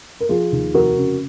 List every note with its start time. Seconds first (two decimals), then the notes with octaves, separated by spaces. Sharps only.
0.20 A#4
0.29 F3 F4 G#4
0.52 D#2
0.74 F1 F#4 A#4
0.97 C#3